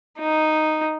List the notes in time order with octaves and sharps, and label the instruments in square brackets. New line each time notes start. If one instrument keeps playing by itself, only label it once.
[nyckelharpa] D#4